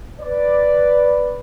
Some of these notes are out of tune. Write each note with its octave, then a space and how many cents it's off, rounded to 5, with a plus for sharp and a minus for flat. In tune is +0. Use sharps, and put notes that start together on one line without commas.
B4 +0 D5 +0